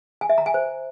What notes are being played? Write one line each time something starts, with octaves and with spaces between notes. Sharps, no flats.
G#5
E5
A#5
G#5
C5